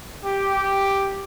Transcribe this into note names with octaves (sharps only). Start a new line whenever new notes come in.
G4